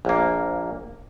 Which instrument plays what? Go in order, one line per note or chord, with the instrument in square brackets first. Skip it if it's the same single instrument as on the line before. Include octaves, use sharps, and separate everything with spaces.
[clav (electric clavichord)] A#1 A#3